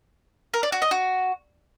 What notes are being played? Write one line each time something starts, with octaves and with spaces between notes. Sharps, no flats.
A#4
D5
F#4
D#5
F#4